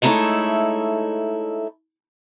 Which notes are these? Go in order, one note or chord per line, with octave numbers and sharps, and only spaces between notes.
G#3 A3 D#4 E4 A4 C#5